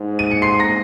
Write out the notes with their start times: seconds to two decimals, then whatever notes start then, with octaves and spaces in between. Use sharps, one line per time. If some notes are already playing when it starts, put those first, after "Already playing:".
Already playing: G#2
0.19 D#7
0.31 C#7
0.42 C6 C7
0.59 A#5 A#6